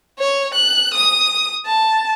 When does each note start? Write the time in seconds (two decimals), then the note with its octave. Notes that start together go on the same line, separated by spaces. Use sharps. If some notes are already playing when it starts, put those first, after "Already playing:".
0.19 C#5
0.55 F#6
0.94 D#6
1.66 A5